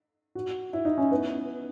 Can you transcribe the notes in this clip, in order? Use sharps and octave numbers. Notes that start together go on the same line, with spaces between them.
F#4
E4
D#4
C#4
B3